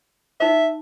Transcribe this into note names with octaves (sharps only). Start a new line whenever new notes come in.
D#4 C5 E5